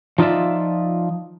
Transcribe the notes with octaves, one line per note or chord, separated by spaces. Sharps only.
F3 D#4 F4 D5 E5